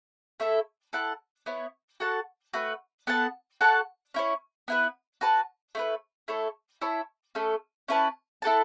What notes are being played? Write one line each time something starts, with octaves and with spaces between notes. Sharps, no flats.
A3 E4 A4 E5
E4 A4 F#5 A5
B3 E4 C#5
F#4 A4 F#5 A5
A3 F#4 B4
B3 A4 F#5 A5
F#4 A4 F#5 A5
C#4 E4 C#5
B3 E4 B4
F#4 B4 A5
A3 E4 B4
A3 E4 A4 C#5
E4 C#5 E5 A5
A3 C#4 A4
C#4 E4 B4 A5
E4 A4 F#5 A5